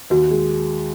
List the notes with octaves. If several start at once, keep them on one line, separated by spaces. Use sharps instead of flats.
D#2 F#4
G#3